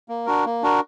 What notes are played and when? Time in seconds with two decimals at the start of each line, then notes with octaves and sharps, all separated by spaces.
0.09 A#3
0.26 D4 F#4 A#4
0.45 A#3
0.63 D4 F#4 A#4